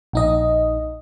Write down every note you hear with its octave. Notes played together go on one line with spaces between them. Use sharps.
A#1 D#4 D#5